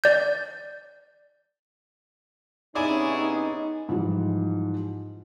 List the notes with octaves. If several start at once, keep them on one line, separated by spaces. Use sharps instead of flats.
D5 G6
C3 B3 C#4 D#4 E4 G#4 D5 G#5
D#4
G#2 E3 F3 G3